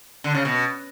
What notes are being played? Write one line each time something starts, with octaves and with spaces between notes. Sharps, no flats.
D3
C#3
B2